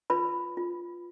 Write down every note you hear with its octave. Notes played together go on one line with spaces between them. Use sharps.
F4 B4 B5
F4